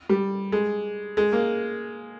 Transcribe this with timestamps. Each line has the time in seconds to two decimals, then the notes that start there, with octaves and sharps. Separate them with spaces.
0.09 G3
0.52 G#3
1.17 G#3
1.33 A#3